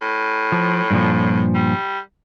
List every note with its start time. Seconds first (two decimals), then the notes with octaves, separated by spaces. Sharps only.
0.02 A2
0.52 F3
0.91 G2 A#2 F3
1.55 G3